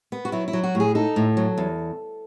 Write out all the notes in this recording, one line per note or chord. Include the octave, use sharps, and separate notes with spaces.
B3
F#4
F#3 E4
E4
F#3
F#4
A2
G#4
D#4 A4
A2
F#3
E2